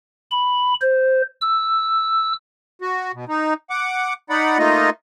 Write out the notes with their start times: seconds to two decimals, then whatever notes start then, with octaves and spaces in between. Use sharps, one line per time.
0.31 B5
0.82 C5
1.41 E6
2.81 F#4
3.14 B2
3.28 D#4
3.70 F#5 D6
4.30 D#4 D5 F#5 B5
4.58 A3 A#3 D#4 F4 D#5